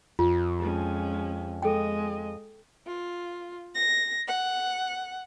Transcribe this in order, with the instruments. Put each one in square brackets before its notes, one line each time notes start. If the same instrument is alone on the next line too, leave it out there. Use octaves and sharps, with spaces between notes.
[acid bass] F2 [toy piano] F4
[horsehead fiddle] G#3 C#4
[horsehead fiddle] G#3 D#5 [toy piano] A4 G5
[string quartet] F4
A#6
F#5